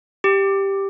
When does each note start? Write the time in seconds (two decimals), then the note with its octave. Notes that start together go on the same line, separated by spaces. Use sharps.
0.24 G4